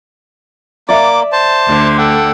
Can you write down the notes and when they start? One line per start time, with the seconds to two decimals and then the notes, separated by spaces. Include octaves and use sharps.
0.89 A#3 D5 E5 D6
1.32 C5 A5
1.66 D2 D3
1.98 A4 F#5 G5